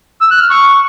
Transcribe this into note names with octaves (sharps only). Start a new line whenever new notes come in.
E6
F#6
F6
C#6